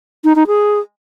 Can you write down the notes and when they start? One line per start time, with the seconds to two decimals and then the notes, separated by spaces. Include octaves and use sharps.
0.24 D#4
0.36 D#4
0.47 G#4